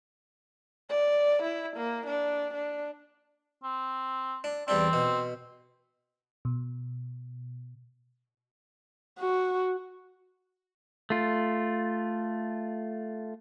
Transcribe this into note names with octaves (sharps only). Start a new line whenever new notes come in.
D5
E4
A#3
D4
D4
C4
D4
E2 G3 C4 D4
B2
B2
F#4
A3 F4